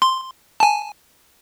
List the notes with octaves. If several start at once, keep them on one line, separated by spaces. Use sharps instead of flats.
C6
G#5 A5